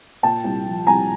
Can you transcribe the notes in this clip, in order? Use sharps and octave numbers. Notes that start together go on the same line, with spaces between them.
A#2 G5 A5
C2
F3
C2 G#5 A#5